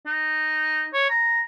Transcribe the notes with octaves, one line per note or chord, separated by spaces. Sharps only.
D#4
C#5
A#5